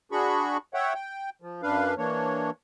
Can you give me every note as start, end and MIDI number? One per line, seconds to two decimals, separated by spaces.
0.12 0.57 62
0.12 0.57 66
0.12 0.57 68
0.12 0.57 83
0.12 0.57 85
0.74 0.94 73
0.74 0.94 76
0.74 0.94 78
0.74 0.94 79
0.94 1.30 79
1.42 1.62 53
1.63 1.95 42
1.63 1.95 62
1.63 1.95 71
1.63 1.95 77
1.98 2.51 52
1.98 2.51 58
1.98 2.51 62
1.98 2.51 73